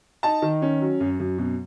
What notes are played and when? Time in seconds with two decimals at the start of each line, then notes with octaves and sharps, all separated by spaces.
0.23 D#4 A5
0.42 D#3
0.62 C#4
0.81 F#3
1.00 F#2
1.20 F#2
1.38 B2